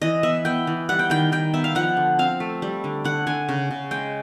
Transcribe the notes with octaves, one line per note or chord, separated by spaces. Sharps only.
E3 D#5
B3 E5
B3 G5
E3
G3 F#5
G5
D#3 G5
D#3 G5
B3 E5
F5
F3 F#5
D3
C4 F5
A3
G3
D3
D3 F#5
D3 G#5
C#3
C#3
G#3 G5